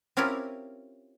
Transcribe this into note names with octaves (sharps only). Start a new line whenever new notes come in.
C4 C#4 E4 F4 G4 A#4